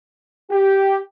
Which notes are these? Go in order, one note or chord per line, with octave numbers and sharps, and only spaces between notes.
G4